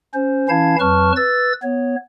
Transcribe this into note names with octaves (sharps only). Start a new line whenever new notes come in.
C#4 C5
E3 C#4 E4 F5 A5 G#6
F2 F#3 B4 A5 C#6 F6
B4 E6 A6
B3 C#5